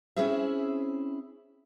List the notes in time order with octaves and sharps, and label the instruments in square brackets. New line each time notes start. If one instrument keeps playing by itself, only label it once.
[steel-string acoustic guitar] C4 C#4 E4 G#4 C5 E5